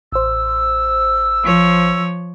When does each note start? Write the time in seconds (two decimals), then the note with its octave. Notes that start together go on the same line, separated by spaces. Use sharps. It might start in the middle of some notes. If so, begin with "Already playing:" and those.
0.12 A1 C5 E6
1.43 F3 C#5